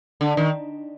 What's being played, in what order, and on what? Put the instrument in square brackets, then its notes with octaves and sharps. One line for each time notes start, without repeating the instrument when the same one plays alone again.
[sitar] D3
D#3